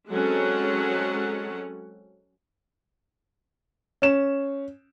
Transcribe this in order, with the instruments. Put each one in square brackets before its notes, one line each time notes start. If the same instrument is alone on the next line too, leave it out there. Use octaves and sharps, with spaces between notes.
[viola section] F#3 G#3 C4 C#4 A4 F#5
[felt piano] C#4 E7